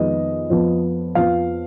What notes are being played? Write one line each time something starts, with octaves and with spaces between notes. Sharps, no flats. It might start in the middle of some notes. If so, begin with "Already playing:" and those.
Already playing: F2 D#3 G#3 B3 D#5
F2 F3 B3
F2 F3 B3 F5